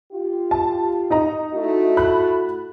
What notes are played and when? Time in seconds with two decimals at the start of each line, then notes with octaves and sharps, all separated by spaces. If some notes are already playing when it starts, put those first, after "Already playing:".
0.12 F4 G4
0.51 A5
1.10 D#4 D#5 A#5
1.52 A3 E4 F#4
1.97 B5 F#6